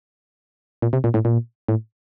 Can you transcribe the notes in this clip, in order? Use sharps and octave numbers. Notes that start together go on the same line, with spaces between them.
A#2
C3
A#2
A2
A#2
A2